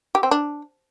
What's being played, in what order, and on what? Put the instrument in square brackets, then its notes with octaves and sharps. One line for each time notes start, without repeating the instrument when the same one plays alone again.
[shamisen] G4
C4
D4